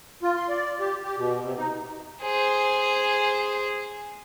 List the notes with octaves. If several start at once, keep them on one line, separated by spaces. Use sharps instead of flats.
F4
C6
D5
G4
G4
B2
C3
D#4
G#4 C5